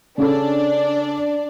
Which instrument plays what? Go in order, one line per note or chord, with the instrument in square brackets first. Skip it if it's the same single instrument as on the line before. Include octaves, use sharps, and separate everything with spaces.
[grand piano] C#3 C#4 A4 [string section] D4 D5